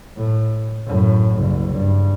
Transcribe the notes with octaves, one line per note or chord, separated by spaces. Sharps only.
A2
F#2 A2
F#1 C2
G2